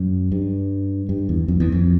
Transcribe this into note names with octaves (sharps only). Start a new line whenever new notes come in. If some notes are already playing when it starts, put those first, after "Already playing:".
Already playing: F#2
G2
G2
E2
F2
E2
F2